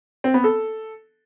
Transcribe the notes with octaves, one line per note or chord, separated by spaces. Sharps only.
C4
B3
A4